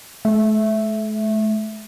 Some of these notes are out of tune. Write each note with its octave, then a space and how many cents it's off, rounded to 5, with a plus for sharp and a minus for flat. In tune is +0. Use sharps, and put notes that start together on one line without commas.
A3 -40 E5 +0